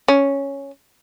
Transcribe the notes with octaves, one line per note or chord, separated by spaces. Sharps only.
C#4